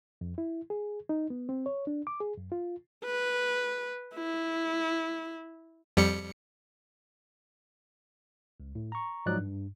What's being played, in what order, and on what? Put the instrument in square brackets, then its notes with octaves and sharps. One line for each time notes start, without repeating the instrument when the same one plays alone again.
[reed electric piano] F2
E4
G#4
D#4
B3
C4
C#5
D4
D6
G#4
F#2
F4
[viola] B4
E4
[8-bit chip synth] F2 G3 C#7
[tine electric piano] C#2
A2
A#5 C#6
G#2 F3 F#3 D#4 D5 F#6
G2